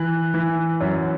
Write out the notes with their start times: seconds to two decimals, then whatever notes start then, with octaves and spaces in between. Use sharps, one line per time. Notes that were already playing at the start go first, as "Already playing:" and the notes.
Already playing: E3 F#6
0.34 E3
0.81 F#2